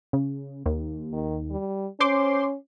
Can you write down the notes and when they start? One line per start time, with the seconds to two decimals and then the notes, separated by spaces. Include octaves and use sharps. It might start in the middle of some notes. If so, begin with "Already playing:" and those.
0.13 C#3
0.66 D#2
1.13 D#3
1.51 G3
2.00 C#4 C5 C6 D6